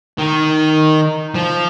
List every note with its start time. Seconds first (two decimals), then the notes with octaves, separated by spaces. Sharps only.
0.18 D#3
1.35 F3